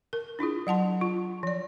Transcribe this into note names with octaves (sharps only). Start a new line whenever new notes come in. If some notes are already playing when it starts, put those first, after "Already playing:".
A#4
D4 E4 F4 G#4
F#3 F#5 A5 C6
F4
F3 D5